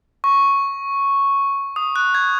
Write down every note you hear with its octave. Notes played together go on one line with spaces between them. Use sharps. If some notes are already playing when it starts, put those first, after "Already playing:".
C#6
D#6
F#6
G#6